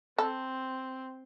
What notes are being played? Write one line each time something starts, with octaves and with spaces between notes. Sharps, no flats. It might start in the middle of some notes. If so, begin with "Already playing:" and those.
C4 A4